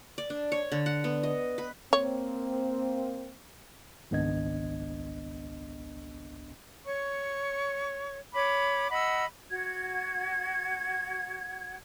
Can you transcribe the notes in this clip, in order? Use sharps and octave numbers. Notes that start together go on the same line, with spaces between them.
D5
D4
C#5
D3
F#5
B3
D#5
B4
A#3 C4 C#5
G#1 C#2 B3 D4 D#5 G#6
C#5 C#6
C#5 B5 D6
D#5 F#5 B5 E6
F#4 G#6